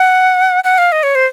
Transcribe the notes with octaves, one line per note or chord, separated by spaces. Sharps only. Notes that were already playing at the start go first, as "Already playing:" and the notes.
Already playing: F#5
F#5
F5
D#5
C#5
C5